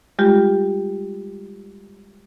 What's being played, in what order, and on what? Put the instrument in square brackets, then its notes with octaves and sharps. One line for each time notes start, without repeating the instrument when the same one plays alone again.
[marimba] G3 G#3 F4 G4